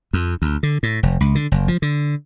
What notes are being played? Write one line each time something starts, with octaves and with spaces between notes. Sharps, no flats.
F2
D2
D3
A2
F1
C#2
D3
F#1
F3
D3